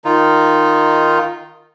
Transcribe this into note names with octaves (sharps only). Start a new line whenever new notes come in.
D#3 D#4 F4